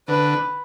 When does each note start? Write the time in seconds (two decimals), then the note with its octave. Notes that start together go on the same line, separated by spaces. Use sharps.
0.08 D3 B4